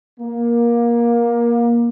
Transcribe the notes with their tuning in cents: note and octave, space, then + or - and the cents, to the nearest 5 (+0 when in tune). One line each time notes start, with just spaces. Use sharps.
A#3 +20